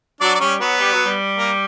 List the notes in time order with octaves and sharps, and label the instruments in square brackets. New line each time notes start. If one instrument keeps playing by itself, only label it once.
[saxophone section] F#3 [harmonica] D4 D5
[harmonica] D5
[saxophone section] G3 [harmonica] C#4 C#5
[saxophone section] F#3 [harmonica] B3 B4
[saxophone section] G3
F#3
G3
[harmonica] A#3 A#4